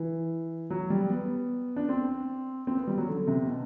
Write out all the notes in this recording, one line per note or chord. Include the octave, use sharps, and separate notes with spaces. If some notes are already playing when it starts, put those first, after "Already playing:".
Already playing: E3
F#3
G3
B3
D4
C4
C4
B3
G3
F#3
D3
C3
B2